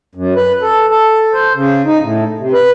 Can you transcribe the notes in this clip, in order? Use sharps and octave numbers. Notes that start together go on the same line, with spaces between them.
F#2
B4
A4
A4
C5
C#3
D#4
A2
C3
B4